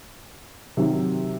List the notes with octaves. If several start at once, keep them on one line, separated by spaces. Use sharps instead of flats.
C3 D#3 F#3